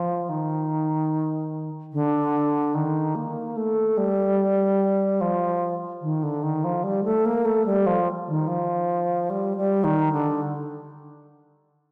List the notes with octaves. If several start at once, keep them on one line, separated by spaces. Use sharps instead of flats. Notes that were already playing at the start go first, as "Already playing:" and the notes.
Already playing: F3
D#3
D3
D#3
A#3
A3
G3
F3
D#3
D3
D#3
F3
G3
A3
A#3
A3
G3
F3
D#3
F3
G3
G3
D#3
D3